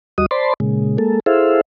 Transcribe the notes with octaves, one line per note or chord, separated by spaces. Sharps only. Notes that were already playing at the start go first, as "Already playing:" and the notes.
D#2 G3 F#4 D#5 D#6
C5 D5 A5 B5 C6
A#2 C#3 G#3
G#3 A#3 A4
E4 G#4 A4 C5 E5 F5